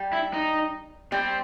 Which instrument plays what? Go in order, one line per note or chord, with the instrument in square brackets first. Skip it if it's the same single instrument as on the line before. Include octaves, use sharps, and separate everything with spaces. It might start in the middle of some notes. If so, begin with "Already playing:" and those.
Already playing: [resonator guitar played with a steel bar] G3
[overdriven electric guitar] E4
D#4
[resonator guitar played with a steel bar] G3 [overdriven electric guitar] C4